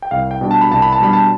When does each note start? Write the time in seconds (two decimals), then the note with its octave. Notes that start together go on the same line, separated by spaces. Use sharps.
0.02 G5
0.11 C2 F5
0.31 G5
0.41 B2 G3 D4
0.51 A5
0.61 B5
0.71 C2 A5
0.82 B5
0.93 A5
1.00 B2 G3 D4 B5
1.13 A5